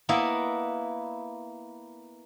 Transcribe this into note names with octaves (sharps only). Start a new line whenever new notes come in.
A#3 B3 E4 D#5